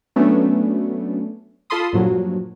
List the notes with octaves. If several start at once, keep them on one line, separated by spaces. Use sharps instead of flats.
F#3 A3 B3 C#4 D4
F4 A4 A5 B5 C6 D#6
G2 A#2 F3 F#3